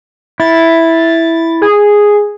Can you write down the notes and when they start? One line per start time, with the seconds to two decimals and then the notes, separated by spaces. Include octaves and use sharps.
0.40 E4 A6
1.62 G#4